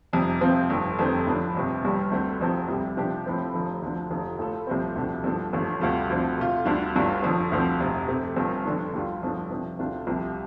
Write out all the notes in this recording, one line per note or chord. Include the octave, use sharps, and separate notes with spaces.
F1 F2 C3 G3
F2 C3 F3 C4 F4
G1 F2 D3
F1 F2 D3 A3 C4
A2 F3 D4
G1 F2 C3
G1 G2 G3
D2 D3 A3 C4
F1 F2 F3 C4 A4
C2 C3 G3
C3 F3 D4 G4
A2 F3 C4 A4
F1 F2 D3 F3
D2 D3 F3 D4
F1 F2 D3 F3 A3
A2 A3 F4 A4
C2 C3 F3 A3 C4
D2 C3 F3 D4 A4
G2 F3 D4 A4
A1 G2 D3 F3
D2 C3 G3 F4 A4
D2 D3 F3 C4
C3 A3 F4
D2 D3 G3 D4 F4
G1 G2 G3 D4 F4
G1 F2 D3 F3
D2 D3 F3 C4
F1 F2 C3
C3 A3 C4
G1 G2 F3 C4
F2 D3 A3 D4
D2 D3 G3 F4
G1 F2 F3 D4 A4
C3 F3 D4
D2 C3 A3 D4 F4
C2 C3 F3